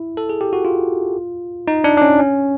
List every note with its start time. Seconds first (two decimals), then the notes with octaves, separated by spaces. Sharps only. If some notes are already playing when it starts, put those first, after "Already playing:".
Already playing: E4
0.17 A4
0.30 G#4
0.41 G4
0.53 F#4
0.65 F4
1.68 D#4
1.84 D4
1.97 D4
2.02 C#4
2.19 C#4